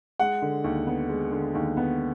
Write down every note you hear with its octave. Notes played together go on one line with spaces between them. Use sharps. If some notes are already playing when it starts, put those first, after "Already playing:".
G#3 F#5
D3
D#2
B3
G#3
D3
D#2
B3